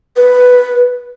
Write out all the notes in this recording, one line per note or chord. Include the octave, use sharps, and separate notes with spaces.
B4